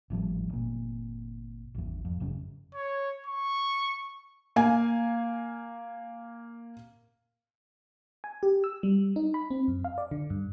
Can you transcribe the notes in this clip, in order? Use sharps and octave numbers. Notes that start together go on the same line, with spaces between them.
G#1 A2 F3 G3
G1 A#2
G#1 E2
F2
G#1 F#2 C#3
C#5
C#6
A#3 F5 G#5
G#5
G4
E6
G3
D#4
B5
C4
F#2
F5
D5
D3
G2